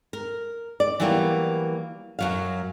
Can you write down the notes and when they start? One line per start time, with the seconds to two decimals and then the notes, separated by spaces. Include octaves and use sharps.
0.13 A#4
0.80 D5
1.00 E3 F#3 G3 A#3 B3
2.19 F#2 F#3 F5